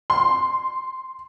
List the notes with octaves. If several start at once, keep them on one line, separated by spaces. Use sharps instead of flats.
C6